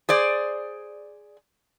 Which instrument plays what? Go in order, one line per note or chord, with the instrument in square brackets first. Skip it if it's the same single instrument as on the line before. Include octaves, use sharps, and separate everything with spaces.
[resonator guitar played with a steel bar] G#4 C5 D5